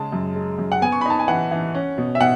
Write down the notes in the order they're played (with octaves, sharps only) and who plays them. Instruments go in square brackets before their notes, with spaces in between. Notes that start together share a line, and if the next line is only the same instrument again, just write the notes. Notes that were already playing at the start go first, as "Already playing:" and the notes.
Already playing: [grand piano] C#3 G#3 A5
F#2
G#3
F#2
F#5
B3 G#5
C#6
B5
D#4 A5
G#5
E3 F#5
E3
C#4
B2
E5
B2 F#5